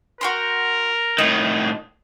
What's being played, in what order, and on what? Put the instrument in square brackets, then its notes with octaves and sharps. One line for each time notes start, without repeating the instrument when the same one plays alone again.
[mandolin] F#4 G5 C6 [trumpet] A#4
[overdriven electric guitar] A2 D#3 [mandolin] D#5